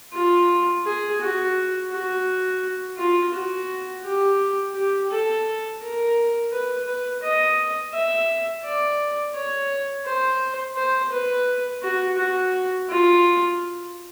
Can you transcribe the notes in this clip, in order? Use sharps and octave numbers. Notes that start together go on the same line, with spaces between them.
F4
G#4
F#4
F#4
F4
F#4
G4
G4
A4
A#4
B4
B4
D#5
E5
D5
C#5
C5
C5
B4
F#4
F#4
F4